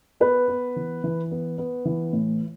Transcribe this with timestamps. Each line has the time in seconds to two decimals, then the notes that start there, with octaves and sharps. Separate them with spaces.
0.20 B3 B4
0.48 B3
0.76 E3
1.04 E3
1.31 B3
1.58 B3
1.85 E3
2.13 A2